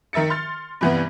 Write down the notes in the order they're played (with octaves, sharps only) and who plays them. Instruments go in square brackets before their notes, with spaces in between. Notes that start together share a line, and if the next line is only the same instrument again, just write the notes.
[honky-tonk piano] D#3 A#4 E5 A6 C#7
C6 F6 A6
G2 C3 E3 G3 B3